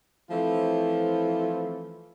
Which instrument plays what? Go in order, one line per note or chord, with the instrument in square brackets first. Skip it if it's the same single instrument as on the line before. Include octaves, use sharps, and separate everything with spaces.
[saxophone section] E3 F3 A3 C4 E4 F4